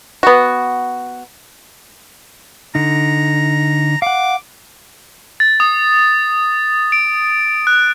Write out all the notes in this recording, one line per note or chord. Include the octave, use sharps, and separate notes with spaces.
B3 F#4
D3 D#4 A#5
F5 F#5 D6
A6
D#6
D7
F#6